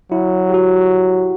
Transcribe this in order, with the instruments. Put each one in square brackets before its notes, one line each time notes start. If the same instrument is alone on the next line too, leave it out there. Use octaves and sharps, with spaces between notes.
[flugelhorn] F#3 [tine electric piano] E4
[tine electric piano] G4
F#4